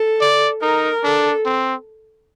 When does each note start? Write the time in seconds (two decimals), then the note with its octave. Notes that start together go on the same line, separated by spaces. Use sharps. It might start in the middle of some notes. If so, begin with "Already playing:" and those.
Already playing: A4
0.21 D5
0.62 D#4 A#4
1.03 D4 A4
1.46 C4